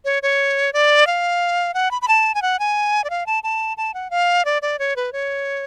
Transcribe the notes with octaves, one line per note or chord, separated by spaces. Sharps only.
C#5
C#5
D5
F5
F#5
B5
B5
A5
G#5
F#5
G#5
D5
F5
A5
A5
A5
F#5
F5
D5
D5
C#5
B4
C#5